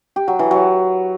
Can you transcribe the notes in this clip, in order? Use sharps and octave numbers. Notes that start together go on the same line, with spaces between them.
G4
F#3
E3
F#3